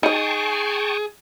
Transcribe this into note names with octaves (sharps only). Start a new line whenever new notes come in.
D#4 G#4 D#5 G5 A5 C#6